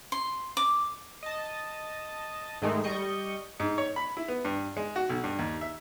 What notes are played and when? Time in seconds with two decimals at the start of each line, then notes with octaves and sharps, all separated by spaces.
0.12 C6
0.57 D6
1.23 D#5 A5
2.62 G#2 D#3 G#3 A3 D#4
2.84 G3 D#5 C#6 G6
3.60 G#2
3.78 C#5
3.96 B5
4.17 E4
4.28 B3
4.45 G2
4.77 G#3
4.96 F#4
5.09 B1
5.24 G2
5.39 D#2
5.61 E5